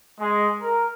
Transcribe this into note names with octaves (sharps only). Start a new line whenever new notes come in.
G#3
A#4